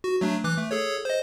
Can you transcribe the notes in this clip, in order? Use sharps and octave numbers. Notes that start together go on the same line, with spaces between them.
F#4
F#3 A3 D4
E3 D6 F#6
A3
G#4 A4 C#5
C5 D#5